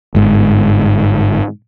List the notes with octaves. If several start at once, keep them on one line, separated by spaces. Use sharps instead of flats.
G1 G#2